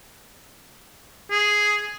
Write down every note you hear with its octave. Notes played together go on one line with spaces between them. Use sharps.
G#4